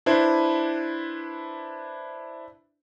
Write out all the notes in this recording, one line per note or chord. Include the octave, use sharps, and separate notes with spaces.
D4 E4 B4 C5